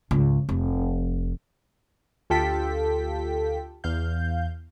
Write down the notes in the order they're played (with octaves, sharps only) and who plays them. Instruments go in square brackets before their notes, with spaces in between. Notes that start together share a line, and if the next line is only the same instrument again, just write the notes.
[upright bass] C#2 G#2
F1
[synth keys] D2 F4 G4 A4 G5 B6
E2 F5 G6